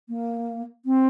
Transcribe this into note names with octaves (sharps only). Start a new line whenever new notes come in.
A#3
C4